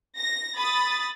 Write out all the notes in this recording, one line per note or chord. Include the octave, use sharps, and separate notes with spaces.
A#6
B5 D#6 A6